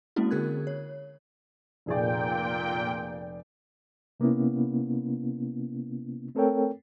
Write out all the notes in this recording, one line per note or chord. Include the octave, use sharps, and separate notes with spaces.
G#3 A#3 C4 C#4 E4 F#4
D3 G#4 A#4 F#6 G#6
C#5
F1 A#2 G#4 D5 G5
C3 A#3 B3 C#4 E4
A3 C4 A4 A#4 C#5 G5